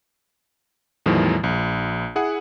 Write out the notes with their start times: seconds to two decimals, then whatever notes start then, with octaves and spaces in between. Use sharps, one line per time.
1.06 E2 A2 D#3 F3 G3
1.44 A#1
2.16 E4 G#4 F#5